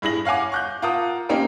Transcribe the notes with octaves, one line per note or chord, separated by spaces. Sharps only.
G2 E4 G#4 A#6 F#7
C#5 F5 F#5 G#5 D6
C#6 F#6 G6
F4 A#4 F#5 A5 D#6
A#3 C4 C#4 D#4 G4 A#4